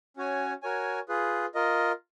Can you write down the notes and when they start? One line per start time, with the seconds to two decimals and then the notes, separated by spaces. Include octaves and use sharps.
0.17 C#4 F#4 C#5 G#5
0.63 F#4 A#4 C#5 G#5
1.09 F4 G#4 B4
1.55 F4 A#4 D#5